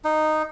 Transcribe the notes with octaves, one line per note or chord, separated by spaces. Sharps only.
D#4